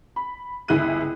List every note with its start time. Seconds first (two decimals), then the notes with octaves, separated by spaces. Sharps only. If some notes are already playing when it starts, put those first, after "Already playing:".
0.16 B5
0.68 G1 C#2 E4 G#4 F#6 D#7